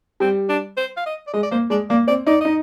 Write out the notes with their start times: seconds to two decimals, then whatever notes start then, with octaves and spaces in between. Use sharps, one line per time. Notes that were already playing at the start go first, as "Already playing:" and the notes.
0.20 G3 C4
0.49 D4
0.77 C5
0.97 F5
1.06 D#5
1.27 D5
1.33 G#3 D#5
1.43 D5
1.51 A#3 C5
1.70 G#3 D5
1.90 A#3 D5
2.08 C4 D5
2.27 D#4 D5
2.41 D#4 D#5